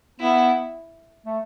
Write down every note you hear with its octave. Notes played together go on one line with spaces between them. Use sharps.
B3 E4
A3